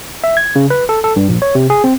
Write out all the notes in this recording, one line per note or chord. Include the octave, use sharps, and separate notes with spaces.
E5
G#6
C#3
B4
A4
A4
G2
A#1
C#5
C3
G#4
C4